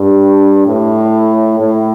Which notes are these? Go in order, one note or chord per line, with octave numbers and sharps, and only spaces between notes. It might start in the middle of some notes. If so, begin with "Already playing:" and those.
Already playing: G2
A2
A2